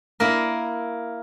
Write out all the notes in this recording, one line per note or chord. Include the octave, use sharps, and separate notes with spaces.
A#3 E4 A#4